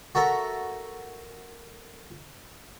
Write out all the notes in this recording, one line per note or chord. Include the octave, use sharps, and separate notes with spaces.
F#4 A4 A#4 E5